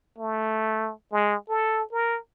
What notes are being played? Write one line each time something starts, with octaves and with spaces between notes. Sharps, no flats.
A3
G#3
A4
A#4